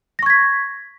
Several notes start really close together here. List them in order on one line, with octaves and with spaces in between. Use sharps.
A#6 C#6 G#6 B6